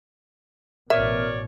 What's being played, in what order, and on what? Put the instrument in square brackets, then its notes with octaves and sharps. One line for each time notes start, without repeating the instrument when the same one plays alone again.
[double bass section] A1 B2 [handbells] A#4 [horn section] C#5 D5 [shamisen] E5